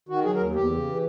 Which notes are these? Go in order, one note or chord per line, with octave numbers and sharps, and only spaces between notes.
D#3 F#4
F#3 G#4
A#4
D#2
E2 G4
C#3
E3